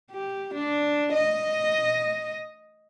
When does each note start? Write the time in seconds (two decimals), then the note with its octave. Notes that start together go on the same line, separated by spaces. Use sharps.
0.12 G4
0.54 D4
1.13 D#5